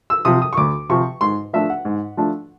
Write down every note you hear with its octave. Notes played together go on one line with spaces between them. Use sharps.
E6
C3 F3 D#6
D#6
C#6
D2 D6
C3 F3 C#6
G#2 C6
F3 A3 D4 E5
F#5
G#2
F3 A3 D4